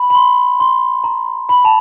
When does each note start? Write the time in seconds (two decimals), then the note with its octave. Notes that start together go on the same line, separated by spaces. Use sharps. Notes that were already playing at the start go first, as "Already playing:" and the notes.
Already playing: B5
0.10 B5
0.15 C6
0.60 C6
1.04 A#5
1.49 B5
1.65 A5